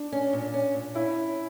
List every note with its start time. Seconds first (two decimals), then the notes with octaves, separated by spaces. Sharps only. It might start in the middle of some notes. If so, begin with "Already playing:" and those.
Already playing: D4
0.12 C#4
0.33 A#2
0.54 C#4
0.74 A#2
0.95 C#4 E4
1.16 C#4